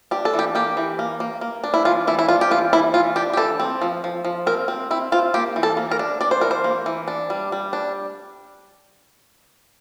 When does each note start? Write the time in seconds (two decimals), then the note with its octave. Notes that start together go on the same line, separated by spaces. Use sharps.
0.11 D4 G4
0.25 A4
0.34 E3
0.39 G4
0.55 A#3 G4
0.77 E3
0.99 A#3
1.20 A#3
1.41 A#3
1.64 D4
1.74 E4
1.85 E3 F4
2.07 E3 E4
2.19 E4
2.28 D4 F4
2.41 G4
2.51 E3 F4
2.73 E3 E4
2.94 E3 F4
3.16 D4 G4
3.33 G4
3.37 E3 A4
3.60 C4
3.81 F3
4.04 F3
4.25 F3
4.46 C4 A#4
4.68 C4
4.91 C4 E4
5.12 C4 F4
5.34 A#3 G4
5.56 E3
5.63 A4
5.77 A#3
5.91 A#4
5.99 D4
6.21 D4 D5
6.31 C5
6.41 E3 A#4
6.51 C5
6.64 A#3
6.86 E3
7.08 D4
7.30 G3
7.52 G3
7.73 D4